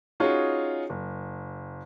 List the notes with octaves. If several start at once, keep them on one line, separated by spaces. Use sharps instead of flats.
C#4 D#4 F4 F#4 G#4 C#5
F#1